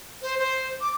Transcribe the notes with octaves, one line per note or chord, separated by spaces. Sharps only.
C5
C5
D6